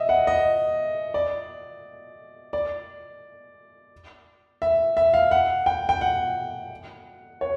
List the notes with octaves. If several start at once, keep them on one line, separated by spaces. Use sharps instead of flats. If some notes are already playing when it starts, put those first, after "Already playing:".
Already playing: D#5 E5
F#5
D#5
D5
D5
E5
E5
F5
F#5
G5
G5
F#5
C#5